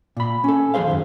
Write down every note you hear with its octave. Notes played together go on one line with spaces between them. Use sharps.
A#2 B5
C#4 A4
D#2 F3 A3 G#4 C5 F5
F#2 A#2 D#3